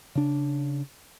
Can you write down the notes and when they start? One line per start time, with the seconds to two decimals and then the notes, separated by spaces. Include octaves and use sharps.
0.15 C#3 D4